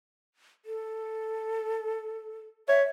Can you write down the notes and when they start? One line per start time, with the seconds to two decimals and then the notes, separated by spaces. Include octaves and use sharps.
0.65 A4
2.69 C#5 E5